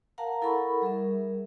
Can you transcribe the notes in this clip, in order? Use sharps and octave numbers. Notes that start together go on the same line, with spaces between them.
A#4 F5 F#5 A5 A#5
E4 A4 A#4 F#5 B5 C#6
G3 G#4 A#4 E5